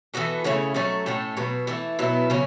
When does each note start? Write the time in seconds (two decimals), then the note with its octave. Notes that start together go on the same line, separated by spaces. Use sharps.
0.14 E3 B3 F#4 A4
0.44 C#3 A3 C#4 E4
0.74 F#3 A3 C#4 A4
1.06 A2 A3 C#4 A4
1.37 B2 F#3 B3
1.67 E3 A3 E4
1.99 B2 F#3 B3 E4
2.30 C#3 F#3 C#4